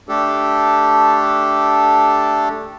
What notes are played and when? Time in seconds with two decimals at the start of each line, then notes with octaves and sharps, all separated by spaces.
0.09 A3 D4 G4 A4